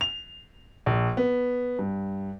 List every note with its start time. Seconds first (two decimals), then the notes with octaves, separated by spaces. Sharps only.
0.01 F7
0.86 A#1
1.17 B3
1.79 G2